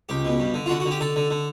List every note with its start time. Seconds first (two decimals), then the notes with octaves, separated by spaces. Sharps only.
0.09 C#2 G4
0.25 B2
0.40 G2
0.54 D3
0.66 F4
0.69 D3 F#4
0.80 F#4
0.86 D3
0.91 G4
1.00 D3 A4
1.16 D3
1.31 D3